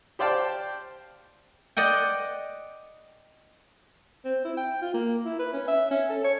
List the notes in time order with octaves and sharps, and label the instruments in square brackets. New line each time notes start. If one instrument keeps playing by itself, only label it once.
[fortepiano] G4 C5 D5 F5 G5 A5
[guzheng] D5 D#5 F#5 G5
[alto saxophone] C4
E4
G5
F4
A#3
E4
B4
C#4
E5
C#4
A4
C#5